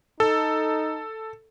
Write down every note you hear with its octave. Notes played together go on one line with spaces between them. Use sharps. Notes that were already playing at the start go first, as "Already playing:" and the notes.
D#4 A4